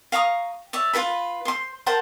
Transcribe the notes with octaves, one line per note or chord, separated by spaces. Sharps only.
F5 A#5 C#6 D#6
C#5 D5 E5
F4 A4 B4 B5
C5 C6
A#4 C5 F#5 A5